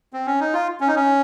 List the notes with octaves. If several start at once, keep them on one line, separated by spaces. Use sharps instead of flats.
C4
C#4
D#4
F4
C#4
D#4
C#4